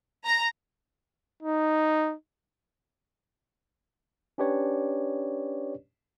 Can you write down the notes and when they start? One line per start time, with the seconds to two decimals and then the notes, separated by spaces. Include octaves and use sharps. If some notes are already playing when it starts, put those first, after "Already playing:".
0.25 A#5
1.42 D#4
4.38 C#4 D4 G4 B4 C#5 D5